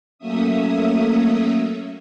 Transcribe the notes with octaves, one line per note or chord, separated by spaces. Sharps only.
F#3 A3 A#3 C#4 E5 D#6